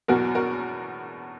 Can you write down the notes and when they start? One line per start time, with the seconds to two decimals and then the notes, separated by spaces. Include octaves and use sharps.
0.08 E2 B2 F#3 F#4 A#4
0.35 F#4 A#4